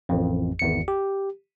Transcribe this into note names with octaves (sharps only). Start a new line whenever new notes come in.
A1 F2
G#1 E2 C#7
G4